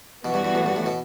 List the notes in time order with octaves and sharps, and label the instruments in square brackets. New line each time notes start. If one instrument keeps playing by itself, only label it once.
[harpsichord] B2 [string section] E3 B3 F#4
[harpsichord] G2
G2
A2
G2
A2
B2